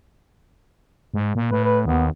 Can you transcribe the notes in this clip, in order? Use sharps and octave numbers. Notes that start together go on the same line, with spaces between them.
G#2
A#2
A2 B4
B4
D#2 B3